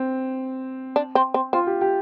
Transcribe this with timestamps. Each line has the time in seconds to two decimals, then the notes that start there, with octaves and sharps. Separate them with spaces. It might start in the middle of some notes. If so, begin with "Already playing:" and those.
Already playing: C4
0.96 D4
1.15 C4
1.34 C4
1.53 C4 F4
1.67 G4
1.81 G4